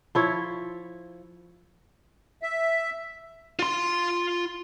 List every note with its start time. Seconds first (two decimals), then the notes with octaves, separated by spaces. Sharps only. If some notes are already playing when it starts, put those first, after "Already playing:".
0.15 F3 E4 C#5
2.43 E5
3.59 F4 C6